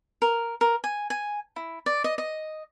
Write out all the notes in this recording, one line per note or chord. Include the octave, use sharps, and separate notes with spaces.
A#4
A#4
G#5
G#5
E4
D5
D#5
D#5